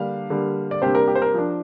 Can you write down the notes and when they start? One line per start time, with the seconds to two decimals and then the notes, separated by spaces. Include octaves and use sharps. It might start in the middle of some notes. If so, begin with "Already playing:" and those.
Already playing: D3 G3 A#3 D4 F5
0.30 D3 G3 A#3
0.71 D5
0.82 C3 G3 A#3 D4 G4 C5
0.95 A#4
1.08 G4
1.15 C5
1.22 A#4
1.34 F3 D4